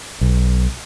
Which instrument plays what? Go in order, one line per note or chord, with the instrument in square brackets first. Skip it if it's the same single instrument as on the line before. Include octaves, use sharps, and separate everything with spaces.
[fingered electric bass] B1